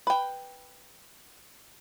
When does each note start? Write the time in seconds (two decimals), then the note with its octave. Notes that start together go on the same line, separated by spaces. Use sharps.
0.07 B4 G5